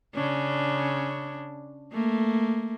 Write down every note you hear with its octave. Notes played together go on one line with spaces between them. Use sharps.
C#3 C#4 D4
A3 A#3